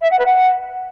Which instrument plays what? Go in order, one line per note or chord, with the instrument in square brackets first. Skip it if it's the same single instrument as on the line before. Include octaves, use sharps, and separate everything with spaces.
[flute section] E5
F#5
B4
F#5